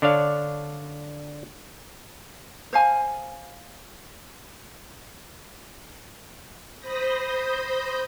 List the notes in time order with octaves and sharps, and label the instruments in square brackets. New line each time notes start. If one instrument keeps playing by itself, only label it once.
[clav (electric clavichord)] D3 D4 C#5 F5
[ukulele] C5 F5 G#5
[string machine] C5 B5 D#6 G6 A#6